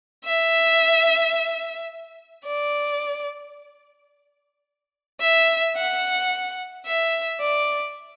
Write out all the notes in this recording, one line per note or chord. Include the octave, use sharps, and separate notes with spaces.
E5
D5
E5
F#5
E5
D5